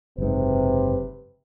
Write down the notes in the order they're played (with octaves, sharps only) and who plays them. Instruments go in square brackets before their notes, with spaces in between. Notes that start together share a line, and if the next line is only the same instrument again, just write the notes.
[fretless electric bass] F#1 G#2 [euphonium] C3 [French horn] B4